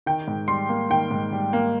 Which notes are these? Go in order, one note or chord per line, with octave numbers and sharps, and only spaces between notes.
D#3 G5
G#2
G3 C6
A#3
D#3 G5
G#2
G3
A#3